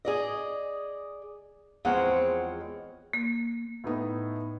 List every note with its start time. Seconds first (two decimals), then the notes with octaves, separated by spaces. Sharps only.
0.05 G#4 D5 D#5
1.85 E2 F3 G#3 C4 C#5 F#5
3.13 A#3
3.84 A2 B3 D#4